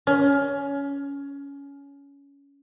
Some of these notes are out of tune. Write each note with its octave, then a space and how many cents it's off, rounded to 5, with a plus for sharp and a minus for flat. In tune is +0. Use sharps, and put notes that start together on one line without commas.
C#4 +20